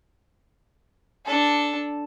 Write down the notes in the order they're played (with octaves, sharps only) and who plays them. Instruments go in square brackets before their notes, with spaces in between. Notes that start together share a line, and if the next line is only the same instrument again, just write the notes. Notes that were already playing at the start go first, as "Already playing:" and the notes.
[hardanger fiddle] D4 A4